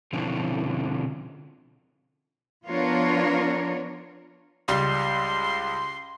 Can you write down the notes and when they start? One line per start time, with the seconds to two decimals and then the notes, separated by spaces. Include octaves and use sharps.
0.13 B2 D3 F3 C4 C#4 E4
2.65 F3 B3 D4 F4 A#4 C#5
4.68 C#2 G3 C6